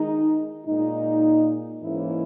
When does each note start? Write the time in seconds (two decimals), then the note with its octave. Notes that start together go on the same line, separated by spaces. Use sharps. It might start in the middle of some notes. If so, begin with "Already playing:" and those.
Already playing: D#3 G#3 D#4
0.66 A#2 G#3 D#4
1.83 G#2 E3 A#3 C#4 E4